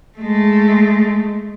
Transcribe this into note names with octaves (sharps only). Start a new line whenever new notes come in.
G#3 A3